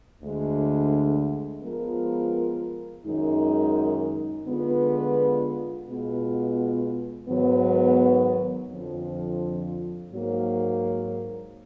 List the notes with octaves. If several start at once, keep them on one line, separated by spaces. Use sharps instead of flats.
D2 D3 G#3
F3 G#3 B3 F4 A#4
F#2 D#3 G#3 D#4
D3 G#3 B3 F4 B4
B2 G#3 B3 F4
G#2 D#3 F#3 B3
F2 D3 F3
G#2 F#3 A#3